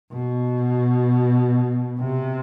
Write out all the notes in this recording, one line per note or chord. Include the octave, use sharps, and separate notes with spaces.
B2
C3